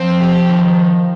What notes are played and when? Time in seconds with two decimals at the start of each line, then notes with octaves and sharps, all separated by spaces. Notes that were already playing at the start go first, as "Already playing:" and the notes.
Already playing: F3 C4
0.20 G4
0.49 D#3